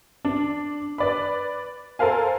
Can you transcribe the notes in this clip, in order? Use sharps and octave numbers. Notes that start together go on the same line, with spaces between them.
D4
B4 D5 B5
A4 A#4 C5 F5 G#5